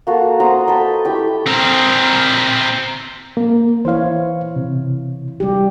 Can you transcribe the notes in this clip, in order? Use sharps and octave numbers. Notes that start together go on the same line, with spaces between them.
A#3 F#4 A4
C5 F#5 A#5 D#6
A4 B4 D#5 G5
A3 E4 G4 G5
C4 A#4
A#3
E3 E4 C5 C#5 F5
C3
G3 G4